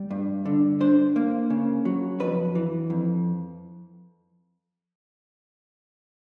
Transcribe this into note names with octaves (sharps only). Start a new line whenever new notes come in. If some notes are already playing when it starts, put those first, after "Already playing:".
Already playing: G3
G2
D3
D4 C5
A#3
C#3
F#3
F2 B4
E3
F2